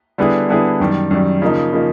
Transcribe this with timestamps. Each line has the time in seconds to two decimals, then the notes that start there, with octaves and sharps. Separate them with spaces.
0.18 D3 G3 B3 E4 G#4
0.49 D3 G3 B3 E4 G#4
0.80 F#2 D#3 G3
1.11 F#2 D#3 G3
1.42 C#3 F3 A#3 D#4
1.73 C#3 F3 A#3 D#4